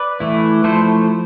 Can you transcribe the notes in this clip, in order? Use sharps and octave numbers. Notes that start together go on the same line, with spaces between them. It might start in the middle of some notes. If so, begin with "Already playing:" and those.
Already playing: B4 D5
E3 A3 E4
F3 A3 E4 A4 C5